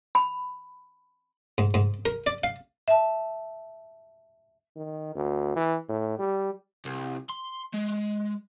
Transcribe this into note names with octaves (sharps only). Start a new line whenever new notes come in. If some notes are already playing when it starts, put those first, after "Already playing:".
B5
G#2
G#2
A#4
D5
F5
E5 A5
D#3
D2
E3
A2
G3
C2
C6
G#3